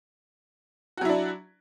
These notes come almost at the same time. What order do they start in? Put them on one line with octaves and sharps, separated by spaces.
F#4 F#3 E4 D4